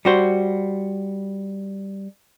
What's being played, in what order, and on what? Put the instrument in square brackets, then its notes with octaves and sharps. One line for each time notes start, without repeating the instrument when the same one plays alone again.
[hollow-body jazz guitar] G3 F#4 C5